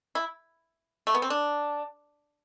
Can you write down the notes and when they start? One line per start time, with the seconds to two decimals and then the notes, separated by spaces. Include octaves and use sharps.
0.15 E4
1.07 A3
1.15 B3
1.22 C4
1.30 D4